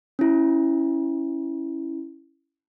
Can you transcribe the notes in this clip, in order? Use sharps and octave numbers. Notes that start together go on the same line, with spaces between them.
C#4 E4